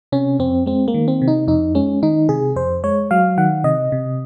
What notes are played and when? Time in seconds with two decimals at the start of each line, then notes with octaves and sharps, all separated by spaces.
0.12 C3 C#4
0.39 F2 C4
0.66 G#3 C4
0.88 A#3
0.94 D#3
1.08 C4
1.22 C3
1.28 D#4
1.47 F2 D#4
1.75 G#3 C#4
2.03 D#3 D#4
2.29 C3 G#4
2.56 F2 C5
2.84 G#3 C#5
3.11 F#3 F5
3.38 D#3 F#5
3.64 C3 D#5
3.92 C3